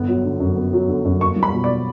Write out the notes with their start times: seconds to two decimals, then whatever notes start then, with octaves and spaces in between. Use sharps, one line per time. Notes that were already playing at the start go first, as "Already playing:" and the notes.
Already playing: G1 B3
0.08 F#3
0.24 D3
0.40 F#2
0.56 B3
0.73 F#3
0.88 D3
1.05 F#2
1.21 A#3 C#6
1.36 G3
1.43 B5
1.53 B2
1.64 D5